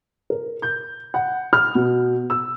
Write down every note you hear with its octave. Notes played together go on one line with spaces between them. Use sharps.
A#4
G6
F#5
F6
B2
E6